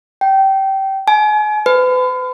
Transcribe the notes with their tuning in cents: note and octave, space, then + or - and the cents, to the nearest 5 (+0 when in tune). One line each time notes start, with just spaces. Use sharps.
G5 -20
G#5 +35
B4 +40